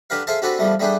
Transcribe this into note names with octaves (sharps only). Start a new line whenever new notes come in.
D3 G4 A#4 B4 F5
G#4 A4 C5 E5 F5 A5
C4 D4 F#4 G4 A4 B4
E2 F3 G3 A3
G3 A3 B3 D4 G#4 G5